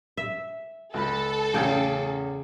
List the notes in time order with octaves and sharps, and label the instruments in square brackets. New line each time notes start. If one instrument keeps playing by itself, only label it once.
[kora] E5
[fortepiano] C#2 B5 [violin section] A4
[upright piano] E2 A2 C#4 [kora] C#3 [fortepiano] G#4 G5